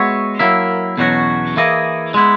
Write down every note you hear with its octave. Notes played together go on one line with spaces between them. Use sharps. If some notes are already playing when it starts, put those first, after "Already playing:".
Already playing: G#3 B3 F#4 C#5 E5
F#3 A#3 E4 A#4 E5
E2 B2 F#3 C#4 F#4
E3 A#3 E4 G#4 D#5
G#3 B3 E4